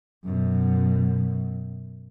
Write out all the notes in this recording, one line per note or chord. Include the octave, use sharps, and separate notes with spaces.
F#2 B2